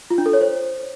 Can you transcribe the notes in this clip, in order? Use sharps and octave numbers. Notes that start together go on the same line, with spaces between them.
F4
D4
A4
C#5
C5